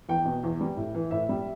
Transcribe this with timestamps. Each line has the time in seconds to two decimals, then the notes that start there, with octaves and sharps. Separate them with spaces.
0.09 E2 G5
0.25 B2
0.44 E2
0.61 G3
0.77 A2
0.95 E3
1.11 A2 E5
1.29 G3